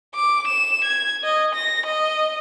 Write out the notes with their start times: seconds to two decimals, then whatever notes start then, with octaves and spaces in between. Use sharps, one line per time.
0.15 D6
0.48 E7
0.85 G#6
1.24 D#5
1.55 A#6
1.87 D#5